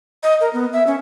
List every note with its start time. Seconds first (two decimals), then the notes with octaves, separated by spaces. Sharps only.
0.23 D#5
0.41 A#4
0.53 B3
0.73 E5
0.87 C#4